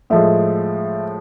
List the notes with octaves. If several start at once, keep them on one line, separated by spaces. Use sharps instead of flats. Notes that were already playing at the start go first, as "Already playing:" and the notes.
A2 F3 G#3 E5